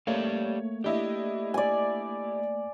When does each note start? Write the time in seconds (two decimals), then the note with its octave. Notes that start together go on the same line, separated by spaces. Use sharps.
0.07 A3 A#3 G4 C#5 D5 F5
0.84 D4 E4 G4 D#5
1.54 D5 G#5